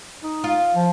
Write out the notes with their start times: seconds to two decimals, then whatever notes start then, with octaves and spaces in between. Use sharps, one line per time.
0.23 D#4
0.44 F4 F5
0.74 F3